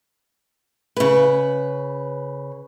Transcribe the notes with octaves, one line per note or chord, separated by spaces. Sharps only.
C#3 B4